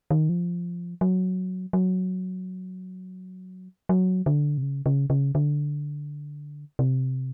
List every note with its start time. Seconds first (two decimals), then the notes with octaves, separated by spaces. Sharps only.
0.11 D#3
0.29 F3
1.01 F#3
1.73 F#3
3.89 F#3
4.26 D3
4.58 C3
4.63 C#3
4.86 C#3
5.10 C#3
5.35 D3
6.79 C3